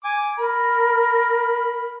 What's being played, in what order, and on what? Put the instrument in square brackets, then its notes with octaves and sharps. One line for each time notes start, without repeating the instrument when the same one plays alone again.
[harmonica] G#5 D6
[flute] A#4 [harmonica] B5